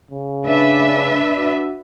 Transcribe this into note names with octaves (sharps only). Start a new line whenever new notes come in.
C#3
D4 B4 E5
F#4